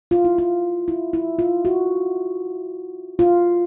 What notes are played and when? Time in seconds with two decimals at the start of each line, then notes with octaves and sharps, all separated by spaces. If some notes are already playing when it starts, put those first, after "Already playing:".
0.11 F4
0.25 E4
0.38 F4
0.88 E4
1.13 E4
1.39 F4
1.65 F#4
3.19 F4